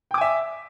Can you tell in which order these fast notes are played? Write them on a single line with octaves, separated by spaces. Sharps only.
G5 D6 G#5 E5